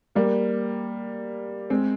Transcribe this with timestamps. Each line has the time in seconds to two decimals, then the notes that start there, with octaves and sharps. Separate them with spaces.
0.15 G3 A#3
1.70 G#3 C4